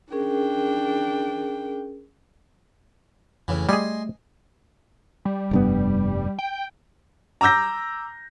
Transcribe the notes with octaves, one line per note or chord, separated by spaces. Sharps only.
C#4 D4 G#4 A#4 G5
F2 A2 C#3 E3
G3 A3 G#4 D#5 G#5 C6
G3
F1 G2 B3
G5
A#5 D6 E6 G6 A#6